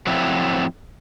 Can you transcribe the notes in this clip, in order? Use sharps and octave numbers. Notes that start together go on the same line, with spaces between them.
F3 F#3 A3 C4 E4